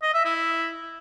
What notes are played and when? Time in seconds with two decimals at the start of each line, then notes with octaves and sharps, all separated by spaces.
0.03 D#5
0.14 E5
0.25 E4